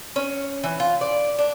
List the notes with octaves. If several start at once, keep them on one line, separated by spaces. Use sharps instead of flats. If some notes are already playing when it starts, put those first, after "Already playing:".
C#4
E3
F4
D5
D4